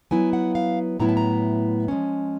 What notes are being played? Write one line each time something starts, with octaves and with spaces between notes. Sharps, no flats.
F#3 B3 E4 G#5
F#5
F5
A2 F#3 B3 E4 A#5
A5
A#5
F3 G#3 C#4